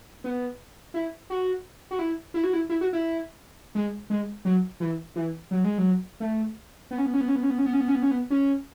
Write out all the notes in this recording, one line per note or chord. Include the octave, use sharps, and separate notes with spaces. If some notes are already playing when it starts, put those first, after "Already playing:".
B3
E4
F#4
F#4
E4
E4
F#4
E4
E4
F#4
E4
G#3
G#3
F#3
E3
E3
F#3
G#3
F#3
A3
B3
C#4
B3
C#4
B3
C#4
B3
C#4
B3
C#4
B3
C#4
B3
C#4
B3
C#4
B3
C#4